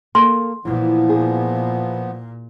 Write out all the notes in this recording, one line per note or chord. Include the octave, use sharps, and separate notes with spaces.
A#3 A4 A#4 C6
A#2 E3 F3 B3
G#4